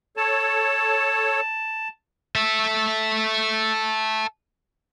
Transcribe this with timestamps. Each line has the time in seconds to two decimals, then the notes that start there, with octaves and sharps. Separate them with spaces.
0.17 A4 C#5 A5
2.35 A4 E5